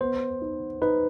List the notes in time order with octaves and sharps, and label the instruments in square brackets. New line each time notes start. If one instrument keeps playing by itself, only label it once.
[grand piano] B3 [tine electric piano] C5
[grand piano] D#4
[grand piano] D#4 [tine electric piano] B4